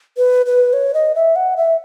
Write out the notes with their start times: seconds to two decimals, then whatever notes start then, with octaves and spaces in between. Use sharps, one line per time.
0.17 B4
0.46 B4
0.73 C#5
0.94 D#5
1.15 E5
1.36 F#5
1.57 E5